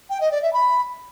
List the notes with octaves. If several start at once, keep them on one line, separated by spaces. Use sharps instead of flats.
G5
D#5
D5
E5
B5